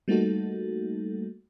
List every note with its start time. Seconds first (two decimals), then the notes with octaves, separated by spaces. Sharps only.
0.08 G3 A3 A#3 D#4 F#4 A4